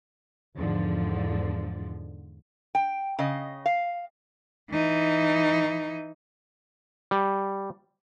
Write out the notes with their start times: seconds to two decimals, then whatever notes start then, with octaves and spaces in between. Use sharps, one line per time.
0.56 E2 G#2 D3 F3
2.75 G5
3.19 C#3 D#5
3.66 F5
4.71 E3 D#4
7.11 G3